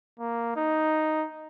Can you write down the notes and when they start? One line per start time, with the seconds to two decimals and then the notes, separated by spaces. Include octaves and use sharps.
0.19 A#3
0.56 D#4